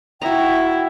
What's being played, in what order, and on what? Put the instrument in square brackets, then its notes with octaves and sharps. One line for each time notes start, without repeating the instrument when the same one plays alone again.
[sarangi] E4 [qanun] F#4 A#5 [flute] G5